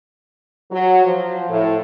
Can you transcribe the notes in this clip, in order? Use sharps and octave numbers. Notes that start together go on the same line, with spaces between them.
F#3
F3
A2